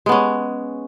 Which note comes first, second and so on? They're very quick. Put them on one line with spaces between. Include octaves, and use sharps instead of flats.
G#3 B3 C#4